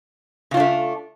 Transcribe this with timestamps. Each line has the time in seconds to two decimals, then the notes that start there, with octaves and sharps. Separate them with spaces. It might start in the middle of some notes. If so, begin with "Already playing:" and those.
0.51 C#3
0.54 F4
0.57 D4
0.60 A3